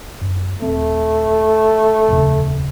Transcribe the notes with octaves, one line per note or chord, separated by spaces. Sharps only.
F#2
D#1 A3 C4
D#1 F2 C#3